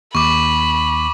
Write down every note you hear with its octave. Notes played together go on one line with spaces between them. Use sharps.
D#2 B5 C#6 D6